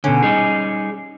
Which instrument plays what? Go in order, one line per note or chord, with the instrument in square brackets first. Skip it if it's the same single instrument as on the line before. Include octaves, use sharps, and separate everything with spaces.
[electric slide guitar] B2 D3 [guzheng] C#4
[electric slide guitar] G3 D#4 G#4